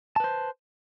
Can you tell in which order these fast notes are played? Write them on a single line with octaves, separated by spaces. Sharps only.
A5 B4 C5